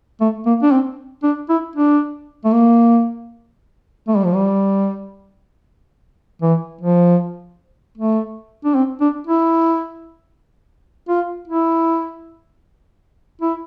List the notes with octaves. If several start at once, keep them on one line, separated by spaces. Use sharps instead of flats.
A3
A#3
D4
C4
D4
E4
D4
A3
A#3
A3
G3
F3
G3
E3
F3
A3
D4
C4
D4
E4
F4
E4
E4